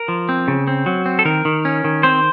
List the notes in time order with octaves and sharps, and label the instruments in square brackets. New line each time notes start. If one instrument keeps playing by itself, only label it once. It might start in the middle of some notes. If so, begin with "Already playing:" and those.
Already playing: [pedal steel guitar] A#4
F3
C4
C#3
C4
F#3
C4
A4
D#3 A#4
D#3
C#4
D#3
C4 C5